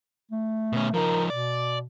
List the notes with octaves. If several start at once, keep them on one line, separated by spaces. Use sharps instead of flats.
A3
B2 C#4
F3 D#4 A#4
B2 D5